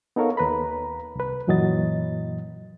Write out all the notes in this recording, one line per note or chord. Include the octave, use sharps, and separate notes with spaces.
B3 D#4 A4 A#4 C#5 F5
D#2 B4 A#5 B5
C2 B4
F#2 A#2 E3 F#3 D#5 A6